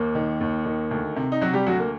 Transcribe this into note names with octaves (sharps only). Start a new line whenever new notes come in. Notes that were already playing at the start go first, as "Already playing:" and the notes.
Already playing: D#2 A#3
D#3
D#2
D#3
D2
C3
D#4
C3 F#3 F#4
G3 G4
D2 F#3 F#4
A#3